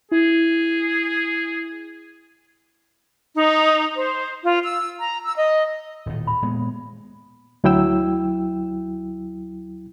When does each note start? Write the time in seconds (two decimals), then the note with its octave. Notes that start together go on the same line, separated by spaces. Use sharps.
0.12 E4 G#4
3.35 D#4
3.95 C5
4.44 F4
4.64 E6
4.99 A#5
5.24 E6
5.36 D#5
6.06 D#1 A2
6.27 B5
6.42 A#2 G#3 B3
7.64 D2 F#3 E4 G5 E6